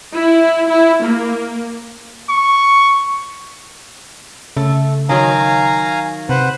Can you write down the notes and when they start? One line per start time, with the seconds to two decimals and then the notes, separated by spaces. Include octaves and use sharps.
0.14 E4
0.69 E4
1.03 A#3
2.29 C#6
4.57 C#3 A3
5.09 D#3 F#3 F5 G#5 A#5
6.29 C3 B4 C5 F#5